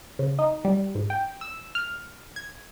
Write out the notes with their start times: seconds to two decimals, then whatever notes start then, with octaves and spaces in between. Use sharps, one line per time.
0.19 C#3
0.39 D#4
0.65 G3
0.95 G#2
1.10 G5
1.41 E6
1.75 F6
2.36 G#6